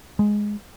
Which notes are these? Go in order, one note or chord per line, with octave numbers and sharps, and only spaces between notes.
G#3